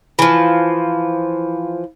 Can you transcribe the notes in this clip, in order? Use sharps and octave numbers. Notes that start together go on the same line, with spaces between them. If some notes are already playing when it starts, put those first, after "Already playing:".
E3 F3